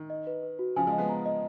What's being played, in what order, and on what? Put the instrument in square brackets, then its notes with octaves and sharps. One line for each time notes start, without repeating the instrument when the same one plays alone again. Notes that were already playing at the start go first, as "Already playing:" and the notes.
Already playing: [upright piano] D#3
[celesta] D#5
B4
B4
F#4
[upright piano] C#3 F3 [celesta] G#5
[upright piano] F3 G#3
[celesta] D#5
[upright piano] G#3 B3
[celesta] A#5
D#5